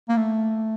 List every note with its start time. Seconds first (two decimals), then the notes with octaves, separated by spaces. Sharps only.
0.09 A#3
0.17 A3